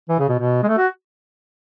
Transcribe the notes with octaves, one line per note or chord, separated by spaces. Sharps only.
E3
C#3
B2
B2
G#3
A3
F#4